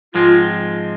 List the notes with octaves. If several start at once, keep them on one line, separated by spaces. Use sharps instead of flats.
G#2 F3 G#3 C4 F4